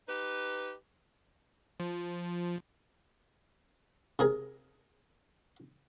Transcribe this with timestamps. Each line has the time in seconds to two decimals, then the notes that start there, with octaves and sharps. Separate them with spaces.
0.07 D#4 G4 B4
1.80 F3
4.19 C3 G#4 A#4